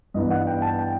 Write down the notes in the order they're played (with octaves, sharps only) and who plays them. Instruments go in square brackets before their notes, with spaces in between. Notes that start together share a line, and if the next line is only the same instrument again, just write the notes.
[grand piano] G2 E3 B3 D#4 D#5
F#5
G5
A5
G5